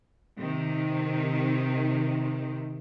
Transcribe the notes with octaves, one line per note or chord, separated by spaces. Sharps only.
C3 D#3